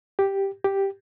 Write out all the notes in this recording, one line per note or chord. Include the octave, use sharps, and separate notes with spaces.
G4
G4